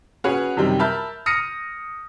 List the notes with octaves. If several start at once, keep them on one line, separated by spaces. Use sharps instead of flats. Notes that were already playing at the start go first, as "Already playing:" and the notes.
C#4 F#4 G#4 B4 C#5 F#5
F#2 C3 D#3 G3
A#4 E5 A5 B5 F6 G6
D#6 F6 A#6 C#7 D#7